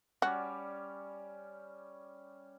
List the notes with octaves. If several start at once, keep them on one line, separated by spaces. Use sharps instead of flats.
G3 C#4 F#4 D5